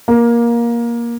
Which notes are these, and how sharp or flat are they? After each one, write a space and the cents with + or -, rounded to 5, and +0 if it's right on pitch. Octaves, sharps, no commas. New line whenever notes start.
A#3 +15